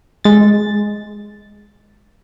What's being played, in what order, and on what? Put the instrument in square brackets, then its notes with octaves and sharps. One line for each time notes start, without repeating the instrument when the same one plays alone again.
[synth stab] G#3 A6